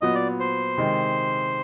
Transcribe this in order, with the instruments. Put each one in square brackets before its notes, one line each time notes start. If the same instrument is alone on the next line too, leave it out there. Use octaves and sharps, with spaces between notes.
[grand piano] A#2 F#3 B3 [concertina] D#5
[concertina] D5
C5
[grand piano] C3 D#3 G#3